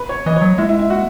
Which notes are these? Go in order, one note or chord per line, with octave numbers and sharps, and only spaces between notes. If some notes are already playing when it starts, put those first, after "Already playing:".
Already playing: B4
C#5
E3 D#5
C#5
F#3
G#3 E4
E4
E4
F#4